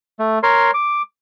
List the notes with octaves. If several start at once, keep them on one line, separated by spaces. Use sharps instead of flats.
A3
A#4 C#5 C6
D6